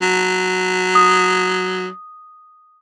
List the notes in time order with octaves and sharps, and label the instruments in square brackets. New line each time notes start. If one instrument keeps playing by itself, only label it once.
[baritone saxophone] F#3
[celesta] D#6